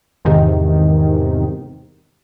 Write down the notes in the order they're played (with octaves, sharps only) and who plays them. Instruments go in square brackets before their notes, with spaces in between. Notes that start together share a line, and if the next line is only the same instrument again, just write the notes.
[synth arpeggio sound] E2 G#2 C3 D#3